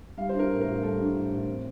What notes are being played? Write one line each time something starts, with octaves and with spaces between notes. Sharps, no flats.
G3 F5
D4 C5
A#4
A2
A#4
A1
G3 A4
D4
A2
A1
C4